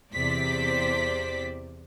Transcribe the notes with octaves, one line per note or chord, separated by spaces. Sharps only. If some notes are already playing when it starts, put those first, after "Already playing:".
E2 C3 C5 D5 B6